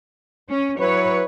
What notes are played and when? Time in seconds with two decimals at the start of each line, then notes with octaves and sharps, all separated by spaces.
0.48 C#4
0.79 F#3 E4 B4 C#5